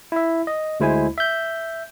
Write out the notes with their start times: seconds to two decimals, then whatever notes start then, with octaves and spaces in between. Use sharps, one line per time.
0.12 E4 E5
0.47 D#5
0.80 D2 G#3 E4 C5 G#5
1.18 E5 G6